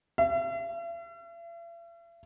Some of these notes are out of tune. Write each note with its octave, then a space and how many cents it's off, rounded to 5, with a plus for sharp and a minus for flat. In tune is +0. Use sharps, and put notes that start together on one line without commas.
E5 +45